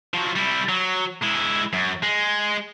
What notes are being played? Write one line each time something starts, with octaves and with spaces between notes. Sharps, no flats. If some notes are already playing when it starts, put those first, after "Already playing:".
F3 F#3
G3 E4
F#3
G#3 E4
F#2
G#3